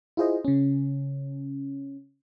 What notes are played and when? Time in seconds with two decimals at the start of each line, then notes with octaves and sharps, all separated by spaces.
0.17 E4 F4 G#4 C5 D#5
0.45 C#3 C#4